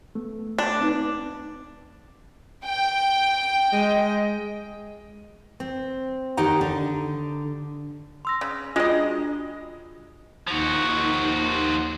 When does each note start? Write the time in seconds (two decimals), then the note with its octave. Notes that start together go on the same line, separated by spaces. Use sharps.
0.15 A3 B3
0.58 D4
0.80 C4 D#4 B4
2.66 G5
3.73 G#3 D#5
5.60 C4
6.37 D#2 D#3 D#4 G4 F#5 A#5
6.61 D3
8.25 C6 E6 A#6
8.41 C#3
8.76 G#3 D4 F4 F#4 D#5
10.47 D#2 F3 D#4 F#4